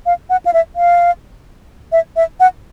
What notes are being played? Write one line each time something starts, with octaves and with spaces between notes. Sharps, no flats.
F5
F#5
F5
E5
F5
E5
E5
F#5